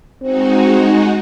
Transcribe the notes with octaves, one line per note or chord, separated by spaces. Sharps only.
G#3 C4 D#4 F#4